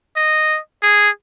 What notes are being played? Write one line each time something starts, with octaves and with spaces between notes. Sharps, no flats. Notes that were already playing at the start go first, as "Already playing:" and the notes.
D#5
G#4